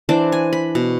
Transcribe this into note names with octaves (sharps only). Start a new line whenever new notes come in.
E3 D4 C5 D6
G#5
B5
B2